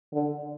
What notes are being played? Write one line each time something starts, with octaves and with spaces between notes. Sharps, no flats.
D3